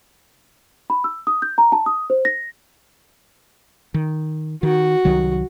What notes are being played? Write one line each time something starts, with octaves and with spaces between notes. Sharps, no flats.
B5
E6
D#6
G6
A#5
A5
D#6
C5
A#6
D#3
D#3 F#4
C2 D#3 F#3